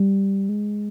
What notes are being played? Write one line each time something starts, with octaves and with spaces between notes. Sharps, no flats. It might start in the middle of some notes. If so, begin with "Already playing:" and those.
Already playing: G3
G#3